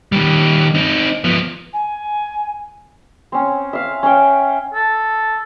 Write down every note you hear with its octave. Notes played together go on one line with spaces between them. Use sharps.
D#3 G3
C4 D#4
F3 B3
G#5
C4 C#4
E5 F5
C#4 G5
A4